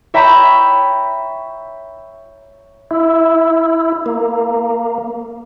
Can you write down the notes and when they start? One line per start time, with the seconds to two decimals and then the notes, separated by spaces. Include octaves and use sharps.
0.14 C#5 E5 G5 A#5 B5
2.91 E4
4.06 A#3